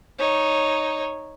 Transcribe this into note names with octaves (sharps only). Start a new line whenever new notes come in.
D#4 C#5